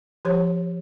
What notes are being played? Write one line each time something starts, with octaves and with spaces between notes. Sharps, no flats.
F3 G4 C5 C#5